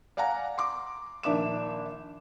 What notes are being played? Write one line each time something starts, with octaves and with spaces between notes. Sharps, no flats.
D5 F5 F#5 G#5 A#5
C6 D6
A#1 D#3 D4 E5 D6 E7